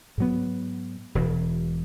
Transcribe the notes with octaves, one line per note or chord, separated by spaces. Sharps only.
G#2 F#3 B3
E1 E2 B2